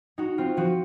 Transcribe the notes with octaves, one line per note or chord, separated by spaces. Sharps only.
D#4 F#4
C4 F4
F3 F#4